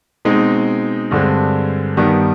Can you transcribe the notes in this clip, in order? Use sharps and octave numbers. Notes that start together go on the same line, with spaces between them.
B2 G#3 C4 D#4
G2 D3 G#3 C4
G2 D#3 G3 B3